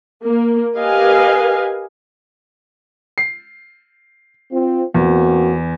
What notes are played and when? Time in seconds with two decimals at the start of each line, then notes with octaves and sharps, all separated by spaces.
0.25 A#3
0.77 G4 A#4 B4 D#5 F5 G#5
3.18 C7
4.51 C4 F4
4.94 E2 A#3 C4 F#4